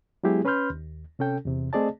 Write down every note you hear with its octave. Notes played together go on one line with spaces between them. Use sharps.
F#3 G#3 B3 E4 G4 G#4
C#4 B4 B5 C6 F6 G6
D#2
C3 C#4 A4 G5
E2 C3
A3 C4 G#4 D5 D#5 A5